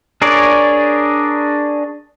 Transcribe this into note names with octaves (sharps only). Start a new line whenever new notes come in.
D4 G#4 A#4 C#5 D5